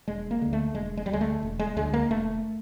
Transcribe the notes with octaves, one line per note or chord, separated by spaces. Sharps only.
E1 G#3
A#3
D2 D3
A3
E1 G#3
G#3
G3
D2 D3 G#3
A3
E1
G#3
D2 D3 G#3
A#3
E1 A3